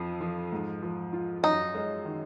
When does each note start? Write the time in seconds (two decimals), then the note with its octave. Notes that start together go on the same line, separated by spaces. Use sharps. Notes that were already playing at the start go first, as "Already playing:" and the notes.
Already playing: F2 F3
0.21 F3
0.52 G#2
0.83 F3
1.13 F4
1.43 F#2 D#4
1.75 G#3
2.05 D#3